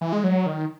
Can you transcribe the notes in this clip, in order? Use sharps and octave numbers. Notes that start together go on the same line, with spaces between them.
E3
G#3
F#3
D#3